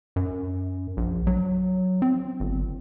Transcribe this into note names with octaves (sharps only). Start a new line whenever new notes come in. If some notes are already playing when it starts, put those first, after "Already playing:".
F#2
A#1
F#3
C4
G1